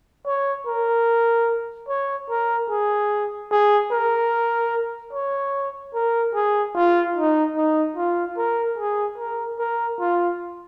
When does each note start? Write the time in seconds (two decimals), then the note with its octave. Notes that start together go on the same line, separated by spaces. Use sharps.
0.26 C#5
0.66 A#4
1.88 C#5
2.30 A#4
2.70 G#4
3.51 G#4
3.91 A#4
5.13 C#5
5.94 A#4
6.34 G#4
6.75 F4
7.16 D#4
7.56 D#4
7.96 F4
8.37 A#4
8.78 G#4
9.18 A#4
9.59 A#4
10.00 F4